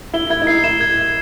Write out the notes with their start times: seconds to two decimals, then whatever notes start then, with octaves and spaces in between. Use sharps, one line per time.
0.14 E4 G7
0.30 E4 G#6
0.42 D#4
0.47 E4 C7
0.64 E4 E7
0.81 G#6
0.98 G#6